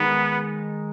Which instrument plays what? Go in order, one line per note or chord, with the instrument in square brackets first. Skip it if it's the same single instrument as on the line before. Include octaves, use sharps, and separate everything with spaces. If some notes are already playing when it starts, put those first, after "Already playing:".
Already playing: [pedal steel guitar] D#3 G#3 D#4 [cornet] B3